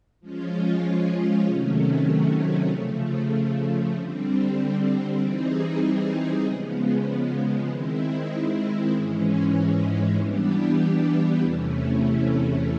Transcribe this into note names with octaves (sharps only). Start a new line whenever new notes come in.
F3 G#3 C#4 F4
C3 D#3 F#3 A3 C#4
C#3 F3 A3
D3 G3 C4
E3 G3 C4 D#4 G#4
C#3 F3 G#3 B3
D#3 G#3 C4 E4
G#2 E3 G#3 C#4
E3 G3 B3 D4 G4
E2 C3 E3 A3 C#4